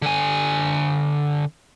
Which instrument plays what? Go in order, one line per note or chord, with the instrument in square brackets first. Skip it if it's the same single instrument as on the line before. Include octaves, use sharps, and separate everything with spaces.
[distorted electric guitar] D3 G#5